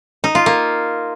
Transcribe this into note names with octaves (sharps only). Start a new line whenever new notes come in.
D#4
F4
A#3